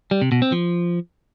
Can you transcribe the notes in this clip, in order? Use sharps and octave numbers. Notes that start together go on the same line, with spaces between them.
G3
C3
B2
C4
F3